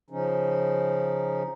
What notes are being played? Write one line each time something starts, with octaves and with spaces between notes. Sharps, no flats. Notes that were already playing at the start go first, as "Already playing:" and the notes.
C#3 F3 C#4 D#4